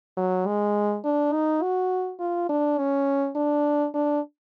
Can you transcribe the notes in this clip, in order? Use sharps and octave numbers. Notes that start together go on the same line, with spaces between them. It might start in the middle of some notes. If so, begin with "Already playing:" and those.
F#3
G#3
D4
D#4
F#4
F4
D4
C#4
D4
D4